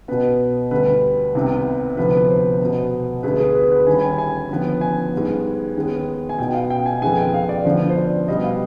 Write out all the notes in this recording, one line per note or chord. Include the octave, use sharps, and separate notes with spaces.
B2 B3 B4
D2 D3 G3 B4
C2 C3 D#3 B3
D2 C3 F3 B3 B4
C5
B2 B3
D2 D3 G#3 B3 B4
G#4
B4
B4
D#2 D#3 G3 G#5
B5
G#5
G#5
D#2 D3 F3 B3
G#5
G#2 G3 B3
D#2 D#3 G#3 B3
G#5
B2 B3 G5
F5
G5
G#5
F2 D#3 G#3 B3 G#5
G5
F5
D5
D2 D3 F3 B3 C5
C5
D5
B2 G3 B3 D#5
F5